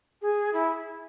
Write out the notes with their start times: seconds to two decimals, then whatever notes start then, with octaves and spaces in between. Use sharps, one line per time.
0.22 G#4
0.53 E4